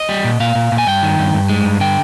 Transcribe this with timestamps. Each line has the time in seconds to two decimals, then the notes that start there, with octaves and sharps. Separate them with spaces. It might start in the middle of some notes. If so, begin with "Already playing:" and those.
Already playing: D#5
0.09 G3
0.24 A#2
0.40 A#2 F5
0.55 A#2
0.72 A#2
0.78 G#5
0.87 G2 G5
1.02 D#3
1.19 G2
1.34 G2
1.49 G#3
1.65 G2
1.80 D3 G5